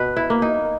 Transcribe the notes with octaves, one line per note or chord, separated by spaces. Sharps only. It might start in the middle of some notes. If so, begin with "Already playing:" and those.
Already playing: B2 B4
E4
A#3
D#4